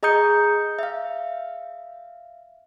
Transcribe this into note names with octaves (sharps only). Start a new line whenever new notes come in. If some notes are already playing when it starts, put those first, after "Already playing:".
G#4 D#5 A#5 D#6 G6 C#7
E5 F5